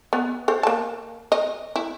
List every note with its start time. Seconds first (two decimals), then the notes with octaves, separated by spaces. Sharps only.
0.13 B3
0.48 A4 C5
0.63 A#3 A5
1.32 D#5
1.76 E4